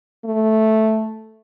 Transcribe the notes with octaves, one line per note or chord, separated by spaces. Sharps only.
A3